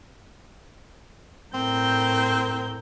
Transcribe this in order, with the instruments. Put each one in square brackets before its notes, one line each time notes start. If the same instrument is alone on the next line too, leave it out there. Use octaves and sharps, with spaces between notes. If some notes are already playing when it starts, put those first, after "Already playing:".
[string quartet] A2 A#4 G6 [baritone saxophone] C4